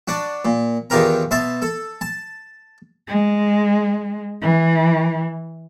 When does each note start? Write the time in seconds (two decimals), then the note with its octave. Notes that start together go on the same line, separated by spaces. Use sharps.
0.08 D4 F#4
0.45 A#2
0.90 E2 D#3 F4 G4 A#4 A#5
1.31 B2 E5 A5 C6
1.62 A4
2.01 A5
3.08 G#3
4.42 E3